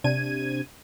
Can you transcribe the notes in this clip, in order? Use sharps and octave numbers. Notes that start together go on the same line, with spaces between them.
C3 D4 G#6 D#7